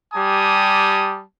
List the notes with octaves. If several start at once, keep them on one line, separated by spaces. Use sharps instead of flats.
G3 G4 G#5 A5 D#6